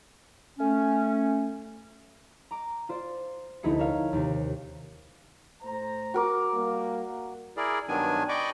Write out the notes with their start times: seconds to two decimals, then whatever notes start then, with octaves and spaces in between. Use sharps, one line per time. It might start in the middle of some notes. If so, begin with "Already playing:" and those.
0.59 A3 C#4
2.51 A#5 D6
2.89 F4 C5 D5
3.63 F1 D2 D#4 E4 G#4 C#7
3.79 A#4 C#5 E5 F5
4.13 D#2 C3
5.62 A2 C5 A#5
6.14 F#4 A#4 D6
6.52 G3 A#3
7.57 E4 G#4 A#4 D5
7.88 G2 D#3 F#3 B3 D4 G#5
8.29 D5 D#5 G5 B5 C#6 D6